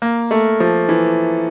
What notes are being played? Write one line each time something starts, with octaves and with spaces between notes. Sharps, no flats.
A#3
A3
F3
E3